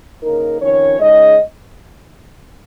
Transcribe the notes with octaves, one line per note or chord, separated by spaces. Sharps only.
C#3 A#3 D#4 A#4
F2 D#3 C#4 C#5
C#3 G#3 D#4 D#5